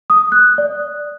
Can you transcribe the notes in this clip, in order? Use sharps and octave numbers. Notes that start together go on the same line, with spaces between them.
D#6
F#6
D5